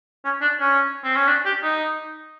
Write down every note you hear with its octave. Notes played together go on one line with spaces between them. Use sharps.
C#4
D4
C#4
C4
C#4
D4
G4
D#4